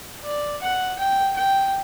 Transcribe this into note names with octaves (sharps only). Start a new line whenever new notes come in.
D5
F#5
G5
G5